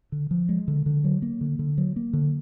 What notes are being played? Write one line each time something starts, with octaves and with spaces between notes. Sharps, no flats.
D3
F3
G#3
D3
D3
F#3
A#3
D3
D3
F#3
A#3
D3